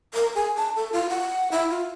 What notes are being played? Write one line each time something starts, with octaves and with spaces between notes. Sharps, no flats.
A#4
G#4
A5
A4
F4
F#5
E4
F4